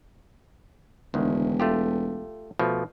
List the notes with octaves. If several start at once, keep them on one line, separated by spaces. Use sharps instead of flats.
E1 D2 D#3
A3 F4 G4
B2 F3 A3